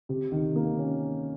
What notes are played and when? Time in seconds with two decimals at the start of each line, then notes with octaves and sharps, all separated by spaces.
0.09 C3
0.32 D#3
0.56 A#3
0.79 C#4